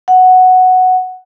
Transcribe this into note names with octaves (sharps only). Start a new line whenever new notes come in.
F#5